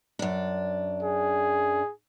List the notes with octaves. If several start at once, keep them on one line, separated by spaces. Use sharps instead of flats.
F#2 D4
G#4